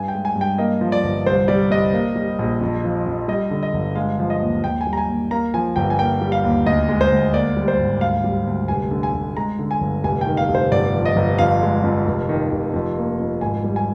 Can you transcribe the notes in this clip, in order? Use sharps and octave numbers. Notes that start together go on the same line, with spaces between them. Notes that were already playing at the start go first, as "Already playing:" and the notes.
Already playing: G2 G#5
G5
G#3
G#5
G2
G5
A#3 D#5
F3
D5
G1
C2 C5
G3 D5
C2 D#5
A#3
G3
A#1
F2
F3
F2
G3 D#5
D3
D#5
G1
G#3 F5
F3
D#5
D#2
D#2 G5
G#5
G3
A#5
G#5
D#2
A#3 A#5
F3 G#5
G1 G5
G#5
A#3 G5
G3
F5
D#2
D2 D#5
G#3
C5
D2
A#3 D5
G3
C5
G#1
D2 F5
G3
D2
F1 G#5
D3
G#5
F1
G#3 A#5
D3
G#5
G1
F1 G#5
G5
D#3
F5
F1
C5
G1 D5
F3
D#5
G1
F2 F5
G#3
F2
F1
D#3
F1
F2
A#3
F2
G#1 G#5
G3
G#5